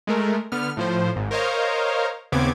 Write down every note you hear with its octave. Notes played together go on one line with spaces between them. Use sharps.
G#3 A3 A#4
D3 B3 F6
A2 F3 C5
G#1 G#2
A#4 C5 C#5 D#5 F5 A#5
D#2 C#3 B3 C4 D6 G#6